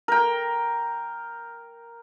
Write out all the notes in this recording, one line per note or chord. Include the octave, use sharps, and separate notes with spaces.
A#4 G5